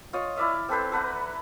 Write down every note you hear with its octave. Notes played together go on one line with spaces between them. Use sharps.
F4 C#5 D#5
E4 D5 E5 F5
C4 A4 B4 C5
A4 B4 F#5 A#5